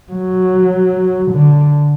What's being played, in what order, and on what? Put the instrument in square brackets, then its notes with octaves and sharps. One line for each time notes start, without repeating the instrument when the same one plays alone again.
[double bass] F#3
D3